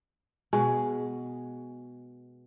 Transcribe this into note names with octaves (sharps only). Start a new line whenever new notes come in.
B2 G#3